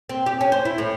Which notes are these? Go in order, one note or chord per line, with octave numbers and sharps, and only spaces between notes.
C4
G4
C#4
C5
E4
A2